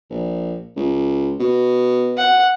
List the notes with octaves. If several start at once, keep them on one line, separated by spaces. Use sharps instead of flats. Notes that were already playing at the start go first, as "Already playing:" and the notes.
A#1
C#2
B2
F#5